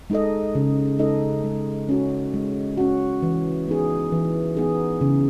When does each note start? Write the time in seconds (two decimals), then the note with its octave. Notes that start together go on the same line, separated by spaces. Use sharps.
0.10 G#3 D#4 A4 D#5
0.55 C#3
0.99 G#3 D#4 A4 D#5
1.44 G#3
1.89 C#4 F#4
2.34 G#3
2.77 C#4 F#4
3.22 E3
3.68 B3 D#4 G#4
4.12 E3
4.57 B3 D#4 G#4
5.01 C#3